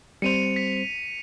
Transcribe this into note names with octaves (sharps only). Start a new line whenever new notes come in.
G3 C4 C5 C#7 D#7 F7
B6